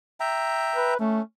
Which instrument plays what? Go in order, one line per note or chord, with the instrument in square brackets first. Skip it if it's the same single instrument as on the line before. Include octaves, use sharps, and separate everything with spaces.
[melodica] E5 G5 A#5
[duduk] B4
[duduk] A3 [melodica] C#4